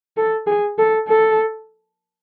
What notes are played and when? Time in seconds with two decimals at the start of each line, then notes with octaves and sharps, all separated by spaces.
0.17 A4
0.47 G#4
0.78 A4
1.08 A4